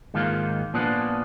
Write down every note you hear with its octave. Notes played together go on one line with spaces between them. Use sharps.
G#2 D#3 A#3 F4
A#2 F3 B3 D4